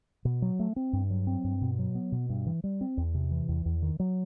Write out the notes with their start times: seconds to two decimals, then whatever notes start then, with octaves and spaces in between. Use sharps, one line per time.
0.25 B2
0.42 F#3
0.59 A3
0.76 C4
0.93 G2
1.10 F#3
1.27 C4
1.44 G2
1.61 B2
1.79 F#3
1.95 B3
2.12 B2
2.29 G2
2.46 E3
2.64 G3
2.81 C4
2.97 E2
3.14 C3
3.31 E3
3.48 E2
3.65 E2
3.82 D#3
4.00 F#3